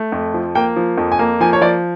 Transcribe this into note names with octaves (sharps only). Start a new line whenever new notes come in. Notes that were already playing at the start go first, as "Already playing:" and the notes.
Already playing: A3
F2
F3
A#3 G5
F3
F2
G#5
A#3
F3 G#5
C#5
F3 D5